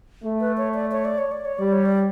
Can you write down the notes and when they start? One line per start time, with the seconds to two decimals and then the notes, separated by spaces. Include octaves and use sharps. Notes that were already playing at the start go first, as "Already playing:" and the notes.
0.24 A3
0.41 B4
0.57 C#5
0.74 D5
0.92 C#5
1.05 D5
1.18 C#5
1.32 D5
1.45 C#5
1.58 G3 D5
1.72 C#5
1.86 D5